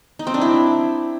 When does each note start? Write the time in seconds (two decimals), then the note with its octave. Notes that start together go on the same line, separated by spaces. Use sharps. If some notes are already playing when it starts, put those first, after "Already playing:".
0.19 D#4
0.27 C4
0.34 D4
0.41 E4